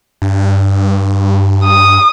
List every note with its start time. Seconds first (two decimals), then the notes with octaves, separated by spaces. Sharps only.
0.22 G2
1.64 D#6